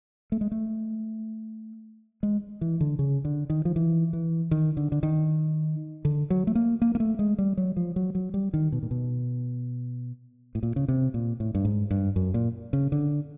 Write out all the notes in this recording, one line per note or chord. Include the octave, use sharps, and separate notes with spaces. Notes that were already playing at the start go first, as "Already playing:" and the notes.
A3
G#3
A3
G#3
E3
D3
C#3
D3
D#3
F3
E3
E3
D#3
D3
D3
D#3
D3
F#3
A3
A#3
A#3
A#3
A3
G#3
G3
F#3
F3
F#3
F#3
G3
D#3
B2
A#2
B2
A2
A#2
C#3
C3
A#2
A2
G2
G#2
G2
F#2
A#2
C#3
D3